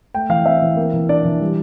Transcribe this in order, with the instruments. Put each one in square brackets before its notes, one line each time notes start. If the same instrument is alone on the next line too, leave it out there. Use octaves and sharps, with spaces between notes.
[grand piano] A3 G5
E3 F5
C4 E5
E3
A#3
E3
D4 D5
E3
G3